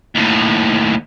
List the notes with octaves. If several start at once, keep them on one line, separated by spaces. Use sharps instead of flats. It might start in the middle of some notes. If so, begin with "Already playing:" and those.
D#2 A2